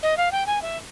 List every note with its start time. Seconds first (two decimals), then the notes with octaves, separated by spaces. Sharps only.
0.03 D#5
0.17 F5
0.32 G5
0.46 G#5
0.62 E5